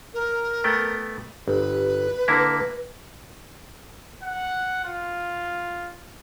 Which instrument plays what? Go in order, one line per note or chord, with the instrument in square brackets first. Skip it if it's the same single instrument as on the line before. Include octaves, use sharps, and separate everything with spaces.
[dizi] A#4
[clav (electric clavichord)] A3 B3 G5
[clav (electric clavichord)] G1 [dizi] B4
[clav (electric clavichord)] D3 A#3 E4
[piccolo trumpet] F#5
F4